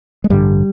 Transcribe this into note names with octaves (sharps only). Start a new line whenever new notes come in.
G#3
A1 G2 D3 G3